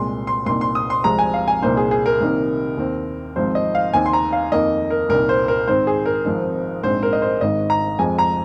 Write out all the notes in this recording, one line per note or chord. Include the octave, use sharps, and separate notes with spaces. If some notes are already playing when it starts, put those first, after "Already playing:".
Already playing: C2 A#2 G#3 C6
C6
C2 A#2 A#3 D#4 C6
C6
D#6
C6
C2 C3 F3 G#3 A#5
G#5
F5
G#5
C2 A#2 A#3 D#4 C5
G#4
G#4
A#4
C2 C3 D#3 A#3 D#4
D#2 D#3 C4
G#1 G#2 F3 C4 C5
D#5
F5
D#2 D#3 C4 D#4 G#5
C6
A#5
F5
F2 D#3 A#3 D#4 D#5
A#4
C2 A#2 A#3 D#4 A#4
C5
A#4
G#2 D#3 C4 C5
G#4
A#4
G#1 G#2 F3 C4 D#4
A#1 G#2 G#3 C4 C5
A#4
D#5
C5
G#1 G#2 D#3 D#5
A#5
F2 F3 G#3 G#5
A#5